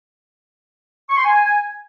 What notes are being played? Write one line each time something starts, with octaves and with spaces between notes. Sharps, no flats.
C#6
C6
G#5